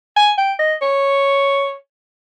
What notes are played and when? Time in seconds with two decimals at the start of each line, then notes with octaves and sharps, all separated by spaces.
0.16 G#5
0.38 G5
0.59 D#5
0.82 C#5